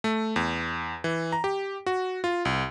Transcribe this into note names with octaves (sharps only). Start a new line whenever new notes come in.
A3
E2
E3
A#5
G4
F#4
F4
C2